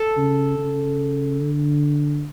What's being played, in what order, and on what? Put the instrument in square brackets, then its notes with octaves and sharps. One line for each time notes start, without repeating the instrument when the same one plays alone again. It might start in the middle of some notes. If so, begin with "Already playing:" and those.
Already playing: [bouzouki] A4
[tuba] C#3
C#3
D3